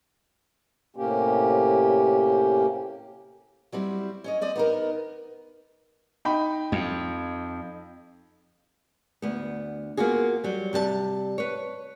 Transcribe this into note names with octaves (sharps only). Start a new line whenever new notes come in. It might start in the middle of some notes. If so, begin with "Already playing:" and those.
A2 C3 A#3 C#4 G4
F#3 G3 C4 E4
C#4 C#5 D#5
C4 D5 D#5
B3 D#4 A#4
D#4 G5 B5
F2
D2 B3
A#3 B3 F4 F#4 G#4
F#3 G3
C3 G3 C5 A5
B4 C#5